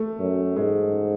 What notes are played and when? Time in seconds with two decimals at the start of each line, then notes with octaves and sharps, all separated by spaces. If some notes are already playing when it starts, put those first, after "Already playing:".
Already playing: A3
0.19 F#2
0.56 G#2 G#3